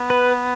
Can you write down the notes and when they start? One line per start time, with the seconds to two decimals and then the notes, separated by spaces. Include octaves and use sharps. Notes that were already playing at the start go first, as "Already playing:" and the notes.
Already playing: B3
0.10 B4